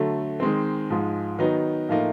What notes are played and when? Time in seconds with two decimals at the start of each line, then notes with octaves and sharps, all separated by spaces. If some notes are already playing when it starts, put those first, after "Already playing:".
Already playing: D3 F#3 A3
0.40 D#3 G#3 C4
0.90 G#2 F3 G#3
1.39 D#3 F#3 B3 D#4
1.89 A2 F3 A#3 D#4